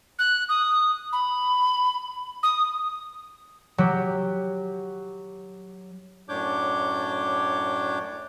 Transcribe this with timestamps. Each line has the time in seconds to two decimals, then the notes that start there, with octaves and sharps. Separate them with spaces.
0.19 F#6
0.49 D#6
1.13 B5
2.43 D#6
3.78 F#3 G4
6.29 F#2 A2 D4 C#5 D6 G6